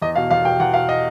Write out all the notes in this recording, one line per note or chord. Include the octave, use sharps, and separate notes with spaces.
E2 D#5
B2 F5
E2 F5
B2 G5
E2 F#5
B2 F5
D#5